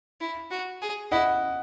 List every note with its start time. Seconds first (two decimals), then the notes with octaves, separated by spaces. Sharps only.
0.21 E4
0.51 F#4
0.82 G#4
1.11 E4 D#5 F#5